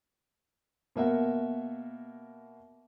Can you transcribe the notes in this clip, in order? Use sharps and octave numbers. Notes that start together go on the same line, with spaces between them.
B2 A#3 E5 F#5